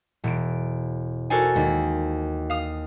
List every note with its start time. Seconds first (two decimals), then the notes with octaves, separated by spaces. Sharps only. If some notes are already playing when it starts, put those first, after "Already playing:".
0.24 E1 D7
1.30 F#4 A4 A#4 C5 D5 G#5
1.55 D#2 G#3
2.50 F5 D#6